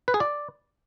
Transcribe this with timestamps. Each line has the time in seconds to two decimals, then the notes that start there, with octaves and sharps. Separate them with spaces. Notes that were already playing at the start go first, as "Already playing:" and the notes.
0.08 B4
0.14 G#4
0.20 D5